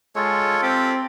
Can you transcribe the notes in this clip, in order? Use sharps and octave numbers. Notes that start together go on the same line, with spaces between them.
G#3 F4 A4 C#5
C4 G4